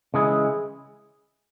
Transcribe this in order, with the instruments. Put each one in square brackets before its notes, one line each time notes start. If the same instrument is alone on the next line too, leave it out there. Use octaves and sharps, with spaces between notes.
[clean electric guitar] C#3 E3 G#3 E4 G#4